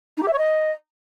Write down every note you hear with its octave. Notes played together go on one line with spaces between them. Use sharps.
D#4
G4
E5
C#5
D#5